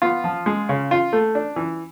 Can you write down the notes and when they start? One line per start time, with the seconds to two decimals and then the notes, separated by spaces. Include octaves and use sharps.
0.02 B3 F4
0.24 F3
0.46 G#3
0.69 C#3
0.91 F4
1.13 A3
1.35 D4
1.56 E3